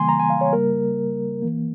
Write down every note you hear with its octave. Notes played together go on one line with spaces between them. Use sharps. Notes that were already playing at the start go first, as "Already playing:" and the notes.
Already playing: C#3 E3 G3 A#3 G#5 C6
A#5
G#5
F5
C#5
C#3 G3 A#3 A#4
E3 A#3